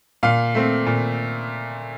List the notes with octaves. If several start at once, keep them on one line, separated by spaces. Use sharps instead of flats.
A#2 F5
A3 C4
A#2